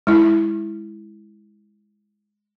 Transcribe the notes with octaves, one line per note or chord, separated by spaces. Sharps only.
G#3 E4